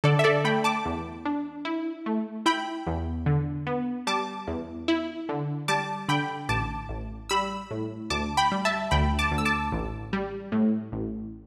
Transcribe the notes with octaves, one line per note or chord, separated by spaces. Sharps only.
D3 A4 D5
E5
A4 D5
A3 G5 B5
A5 D6
E2
D4
E4
A3
E4 G5 B5
E2
D3
B3
G3 A5 D6
E2
E4
D3
G3 A5 D6
D3 G5 B5
A1 A5 D6
A1
G3 B5 E6
A2
D2 A5 D6
G5 B5
G3
E5 A5
D2 G5 B5
A5 D6
D2
E6
A5 D6
A1
G3
A2
A1